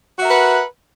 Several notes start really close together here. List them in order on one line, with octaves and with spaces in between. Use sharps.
F#4 E5 A#4 B4 F#5